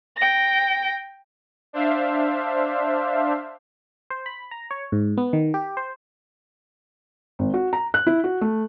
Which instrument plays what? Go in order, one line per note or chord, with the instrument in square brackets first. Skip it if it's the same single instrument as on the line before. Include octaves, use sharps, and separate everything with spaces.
[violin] G5 A#6
[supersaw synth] D4 C5 E5 F5
[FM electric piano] C5
B5
A#5
C#5
G#2
B3
D#3
G4
C5
[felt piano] G#1
F#4
A#5
F#6
E4
F#4
A3